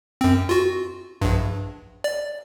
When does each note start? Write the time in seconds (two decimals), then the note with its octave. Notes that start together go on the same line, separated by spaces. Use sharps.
0.21 F#2 C4
0.49 F4 F#4
1.22 A#1 G2
2.04 D5